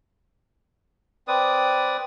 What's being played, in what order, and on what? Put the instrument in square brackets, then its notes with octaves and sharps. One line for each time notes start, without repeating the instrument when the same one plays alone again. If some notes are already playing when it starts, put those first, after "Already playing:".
[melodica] C4 B4 D5 D#6